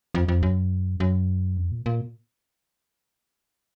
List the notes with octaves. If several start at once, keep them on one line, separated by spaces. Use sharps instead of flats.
F2
F2
F#2
F#2
F2
A#2
A#2